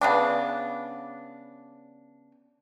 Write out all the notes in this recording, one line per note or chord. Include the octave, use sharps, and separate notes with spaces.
C#3 B3 D4